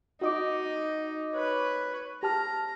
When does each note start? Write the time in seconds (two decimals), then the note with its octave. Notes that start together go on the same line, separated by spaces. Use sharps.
0.21 D#4 F#4 D#5 D6
1.34 B4 C#5
2.23 G4 A5 A#5 F6